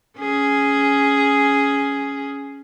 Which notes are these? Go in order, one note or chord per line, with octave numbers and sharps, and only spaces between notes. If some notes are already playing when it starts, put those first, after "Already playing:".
C#4 G#4